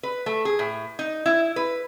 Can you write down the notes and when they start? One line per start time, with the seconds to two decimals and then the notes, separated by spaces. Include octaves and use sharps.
0.03 B4
0.26 A3
0.45 G#4
0.59 A2
0.99 D#4
1.26 E4
1.56 B4